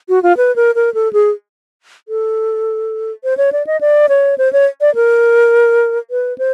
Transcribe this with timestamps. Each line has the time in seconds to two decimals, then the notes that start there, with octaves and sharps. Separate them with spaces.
0.09 F#4
0.23 F4
0.37 B4
0.56 A#4
0.75 A#4
0.94 A4
1.13 G#4
2.08 A4
3.24 C5
3.37 C#5
3.52 D5
3.67 D#5
3.81 D5
4.09 C#5
4.38 C5
4.53 C#5
4.81 D5
4.95 A#4
6.11 B4
6.38 C5